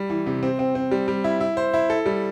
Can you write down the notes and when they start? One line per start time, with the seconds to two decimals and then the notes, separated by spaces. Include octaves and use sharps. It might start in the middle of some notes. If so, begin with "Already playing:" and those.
Already playing: G3
0.10 E3
0.26 C3
0.43 C4
0.59 C4
0.75 C4
0.91 G3
1.08 G3
1.24 E4
1.40 E4
1.57 C5
1.74 E4
1.90 A4
2.06 G3